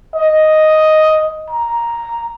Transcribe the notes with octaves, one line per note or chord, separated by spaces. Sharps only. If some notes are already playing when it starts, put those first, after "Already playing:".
D#5
A#5